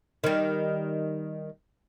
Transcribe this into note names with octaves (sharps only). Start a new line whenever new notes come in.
D#3 G3